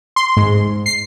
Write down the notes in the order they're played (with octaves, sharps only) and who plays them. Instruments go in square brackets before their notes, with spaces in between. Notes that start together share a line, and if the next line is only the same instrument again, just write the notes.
[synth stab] C6
G#2
C7